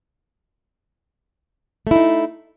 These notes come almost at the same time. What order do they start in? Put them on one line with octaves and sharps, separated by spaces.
A3 E4 D#4